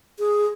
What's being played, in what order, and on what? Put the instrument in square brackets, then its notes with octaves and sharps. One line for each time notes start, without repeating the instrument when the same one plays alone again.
[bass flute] G#4